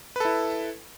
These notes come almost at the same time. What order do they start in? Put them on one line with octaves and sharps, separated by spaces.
B4 A4 E4